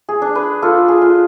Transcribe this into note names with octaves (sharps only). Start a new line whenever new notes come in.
G#4
D4
B4
F4 A4
G#4
F4